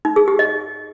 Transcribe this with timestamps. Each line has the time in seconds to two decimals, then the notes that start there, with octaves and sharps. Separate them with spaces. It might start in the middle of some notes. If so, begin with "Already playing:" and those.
0.05 D#4
0.16 G#4
0.28 G4
0.39 D#5